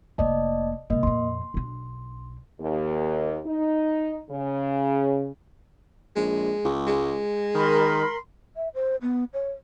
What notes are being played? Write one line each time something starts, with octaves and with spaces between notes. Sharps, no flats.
F1 A#3 D5 D#5 A5
G#2 C3 A#3 D#5
F2 A#2 C6
B1 D4
D#2
D#4
C#3
A#1 G#3
C#2
G#3
D#3 A#4 B5 C6
E5
C5
B3
C#5